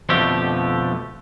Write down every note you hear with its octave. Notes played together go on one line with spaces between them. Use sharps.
F2 B2 D3 F3 A3 G4